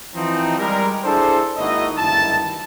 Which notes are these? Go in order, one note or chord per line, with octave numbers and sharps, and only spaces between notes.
E3 F3 C4 D#4
G3 G#3 A#4
D4 E4 G#4 A4 C5
G#1 A#3 D#4 E4 F#4 D#5
F#1 D2 G2 D#3 E4 A5